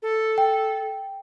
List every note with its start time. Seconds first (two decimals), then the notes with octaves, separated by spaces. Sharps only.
0.02 A4
0.38 G5